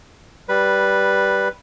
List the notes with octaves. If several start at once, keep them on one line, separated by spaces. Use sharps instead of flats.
G3 B4